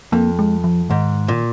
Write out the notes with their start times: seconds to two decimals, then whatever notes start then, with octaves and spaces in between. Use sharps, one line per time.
0.12 F2 A#3
0.39 G#3
0.64 F3
0.90 G#2 D#3
1.28 A#2